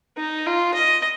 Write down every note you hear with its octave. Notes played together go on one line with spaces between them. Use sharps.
D#4
F4
D#5